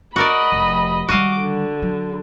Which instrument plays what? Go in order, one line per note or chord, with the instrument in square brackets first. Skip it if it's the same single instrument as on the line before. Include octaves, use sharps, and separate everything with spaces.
[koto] F#4 A#4 D5 [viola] D#5 B5
[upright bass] F1
[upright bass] D#3 G3 [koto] F#4 D#5 F5 [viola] D6
[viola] D3
[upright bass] F#3